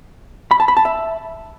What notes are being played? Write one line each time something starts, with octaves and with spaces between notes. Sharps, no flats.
B5
A5
B5
A5
E5